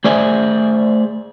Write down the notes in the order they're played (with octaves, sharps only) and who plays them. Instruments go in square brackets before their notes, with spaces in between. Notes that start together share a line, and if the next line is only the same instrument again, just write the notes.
[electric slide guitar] A3 G#4 C5 D5 E5 G#5